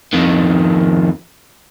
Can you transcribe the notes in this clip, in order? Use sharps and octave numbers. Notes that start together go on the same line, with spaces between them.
F2 D#3